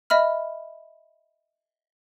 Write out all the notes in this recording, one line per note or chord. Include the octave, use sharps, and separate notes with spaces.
D#5 E5 B5 F6